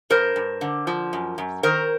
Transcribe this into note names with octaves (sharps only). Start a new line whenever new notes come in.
G2 A#4 C5
G2
D3
F3
F#2
F#2
D#3 A#4 C5